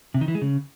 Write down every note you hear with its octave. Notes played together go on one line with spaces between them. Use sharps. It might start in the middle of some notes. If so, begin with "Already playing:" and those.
C3
D#3
E3
G#3
C#3